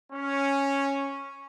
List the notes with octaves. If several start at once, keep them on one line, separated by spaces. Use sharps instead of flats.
C#4